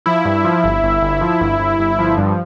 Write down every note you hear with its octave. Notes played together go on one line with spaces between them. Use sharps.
F3 E4
G2
F3
G1
G1
G1
F3
G1
G1
G1
F3
G2